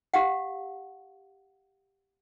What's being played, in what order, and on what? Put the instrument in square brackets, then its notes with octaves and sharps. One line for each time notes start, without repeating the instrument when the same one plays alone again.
[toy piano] G4 F5 F#5